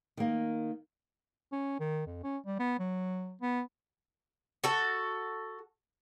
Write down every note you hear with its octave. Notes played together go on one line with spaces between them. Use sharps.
D#3 A#3
C#4
D#3
F2
C#4
G3
B3
F#3
B3
F#4 A4